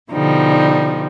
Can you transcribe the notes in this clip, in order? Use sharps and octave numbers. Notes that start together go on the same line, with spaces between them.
B2 D3 F3 G3 D#4